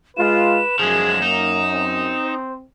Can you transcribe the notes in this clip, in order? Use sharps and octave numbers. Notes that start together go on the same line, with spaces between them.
G#3 F4 B4 E7
F#2 F3 G#3 G#4
A#3 D#4
C4
C5